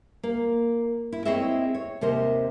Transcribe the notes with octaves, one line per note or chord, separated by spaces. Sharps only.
A#3
E4
C4 E4 G#4 C#5 D#5 E5
C#5
D#2 C3 A#4 C5 D#5